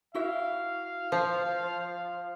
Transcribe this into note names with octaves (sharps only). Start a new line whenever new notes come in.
E4 F#4 E5 F5
F3 C5